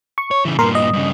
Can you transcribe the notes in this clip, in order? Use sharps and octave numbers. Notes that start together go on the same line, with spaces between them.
C#6
C#5
C#3 E3
G2 A#2 A#4 C6
D#5
G2 C#3